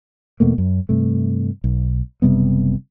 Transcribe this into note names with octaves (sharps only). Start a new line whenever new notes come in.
E2 B2 A3 A#3
F#2
G2 C3 A3
B1
F#1 C3 G3 B3